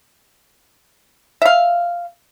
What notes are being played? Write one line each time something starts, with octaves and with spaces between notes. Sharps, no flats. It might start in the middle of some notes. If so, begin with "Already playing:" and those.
E5 F5